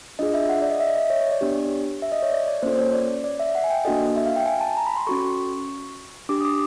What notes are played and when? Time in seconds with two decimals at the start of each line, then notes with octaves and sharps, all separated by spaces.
0.19 D4 F4 G#4 D#5
0.34 E5
0.49 F#5
0.62 D5
0.71 D#5
0.80 E5
0.90 E5
0.95 D#5
1.10 C#5
1.21 C#5
1.31 D5
1.41 B3 D4 G4
2.02 E5
2.12 D#5
2.22 C#5
2.32 D5
2.48 D5
2.62 A#3 C#4 F4 A4 C5
2.79 C#5
2.93 D5
3.24 D5
3.40 E5
3.55 F#5
3.64 G#5
3.70 G5
3.85 A#3 D4 F#4 A4 D#5
4.16 E5
4.26 F5
4.36 G5
4.46 G#5
4.61 A5
4.77 A#5
4.87 B5
4.97 C6
5.07 C#4 F#4 A4 C#6
6.29 D4 G4 D6
6.41 D#6
6.45 D6